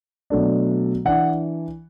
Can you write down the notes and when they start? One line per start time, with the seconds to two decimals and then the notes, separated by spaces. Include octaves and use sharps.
0.30 B2 F#3 A3 D4
1.05 E3 D4 F#5